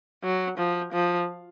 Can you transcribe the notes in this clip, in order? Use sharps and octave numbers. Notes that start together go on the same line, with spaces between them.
F#3
F3
F3